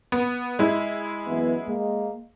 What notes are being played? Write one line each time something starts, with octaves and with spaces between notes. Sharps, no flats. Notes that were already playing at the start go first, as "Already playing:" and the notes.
B3
G#3 E4
F#2 E3 B3
G#3 A#3